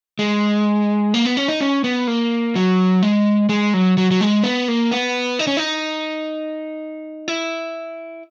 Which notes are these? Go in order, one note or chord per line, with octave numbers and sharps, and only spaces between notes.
G#3
A#3
B3
C#4
D#4
C#4
B3
A#3
F#3
G#3
G#3
F#3
F#3
F#3
G#3
B3
A#3
B3
D#4
C#4
D#4
E4